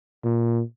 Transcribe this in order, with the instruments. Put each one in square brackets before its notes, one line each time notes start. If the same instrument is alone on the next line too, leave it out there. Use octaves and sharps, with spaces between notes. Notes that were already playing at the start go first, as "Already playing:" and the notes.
[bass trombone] A#2